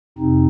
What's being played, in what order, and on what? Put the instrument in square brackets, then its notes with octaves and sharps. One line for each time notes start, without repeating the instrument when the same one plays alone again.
[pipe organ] F2 C3 C4 D#4